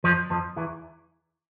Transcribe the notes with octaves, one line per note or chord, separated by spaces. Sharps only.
F2 F3
F2 F3
E2 E3